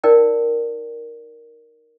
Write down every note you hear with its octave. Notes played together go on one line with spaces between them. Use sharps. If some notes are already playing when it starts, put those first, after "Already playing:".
D#4 A#4 D5 G5